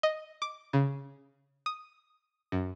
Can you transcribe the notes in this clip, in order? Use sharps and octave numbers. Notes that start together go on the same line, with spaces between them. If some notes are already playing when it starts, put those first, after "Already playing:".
D#5
D6
C#3
D#6
F#2